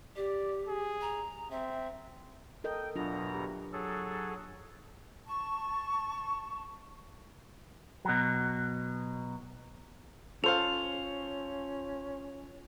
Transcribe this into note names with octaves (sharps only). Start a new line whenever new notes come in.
G4 D5
G#4
A#5
C4 E5
A4 A#4 D#5 G5
E2 B2 F#3 D4 F4 A#5
G4
F#3 G#4 A4
A5 C#6
B2 F#3
C#4 F4 A4 C5 C#5 F5 F7